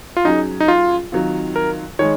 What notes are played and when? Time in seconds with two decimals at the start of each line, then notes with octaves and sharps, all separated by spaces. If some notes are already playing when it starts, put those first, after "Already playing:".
0.17 F4
0.25 F#3 C#4 D#4 G#4
0.60 D#4
0.68 F4
1.12 D#3 F#3 C4 F4
1.56 A#4
1.99 D#3 G#3 C#5